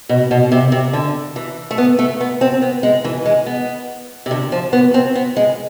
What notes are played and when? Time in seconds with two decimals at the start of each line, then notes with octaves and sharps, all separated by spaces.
0.09 B2
0.31 B2
0.52 C3
0.72 C3
0.93 D3
1.36 E3
1.71 A3
1.78 B3
1.99 A3
2.20 B3
2.41 C4
2.62 B3
2.83 G#3
3.04 E3
3.26 G#3
3.46 B3
4.26 C3
4.31 D3
4.52 F3
4.73 B3
4.94 C4
5.15 B3
5.36 G#3